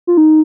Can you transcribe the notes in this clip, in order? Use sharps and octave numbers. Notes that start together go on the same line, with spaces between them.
F4
D#4